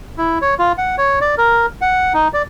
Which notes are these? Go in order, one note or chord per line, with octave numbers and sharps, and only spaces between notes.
E4
C#5
F4
F#5
C#5
D5
A#4
F#5
D#4
D5